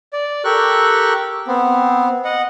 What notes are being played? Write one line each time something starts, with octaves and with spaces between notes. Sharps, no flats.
D5
G4 A4 A#4 C#6 F#6
B3 C4
D#5 F#5